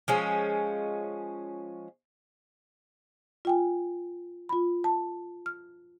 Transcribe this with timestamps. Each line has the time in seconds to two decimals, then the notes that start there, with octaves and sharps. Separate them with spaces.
0.08 F3 G#3 C#4
3.45 F4 G5 G#5
4.49 F4 B5
4.84 A5
5.46 F6